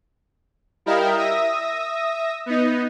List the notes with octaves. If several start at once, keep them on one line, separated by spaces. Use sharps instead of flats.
G3 E4 A#4 D#5 F5 G5
E5 D#6 A#6
B3 D#4